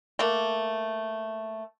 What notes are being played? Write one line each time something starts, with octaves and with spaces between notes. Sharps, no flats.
A3 A#3